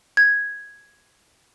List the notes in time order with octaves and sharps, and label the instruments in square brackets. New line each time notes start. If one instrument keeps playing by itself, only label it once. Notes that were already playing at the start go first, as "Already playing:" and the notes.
[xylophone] G#6